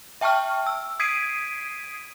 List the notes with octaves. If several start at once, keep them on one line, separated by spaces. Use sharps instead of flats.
E5 G5 A5 C#6 F6
E6
D#6 G#6 B6 C7 D7 D#7